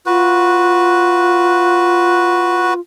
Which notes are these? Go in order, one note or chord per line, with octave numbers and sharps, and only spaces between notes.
F4 F#4 B4